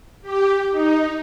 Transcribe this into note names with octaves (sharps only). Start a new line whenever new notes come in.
G4
D#4